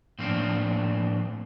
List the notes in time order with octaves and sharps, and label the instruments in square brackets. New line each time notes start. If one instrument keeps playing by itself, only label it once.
[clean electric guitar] A2 F3 A#3 C4 D4